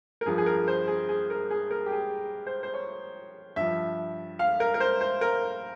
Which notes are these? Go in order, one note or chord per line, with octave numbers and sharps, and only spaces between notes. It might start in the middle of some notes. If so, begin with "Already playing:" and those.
A#4
G2 F3 G#4
G#4
A#4
C5
G#4
G#4
A#4
G#4
A#4
G4
G#4
C5
C5
C#5
G2 F3 E5
F5
A#4
A#4
C5
C5
A#4